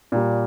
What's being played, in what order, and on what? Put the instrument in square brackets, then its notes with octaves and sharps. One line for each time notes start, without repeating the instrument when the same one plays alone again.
[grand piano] A#2 G3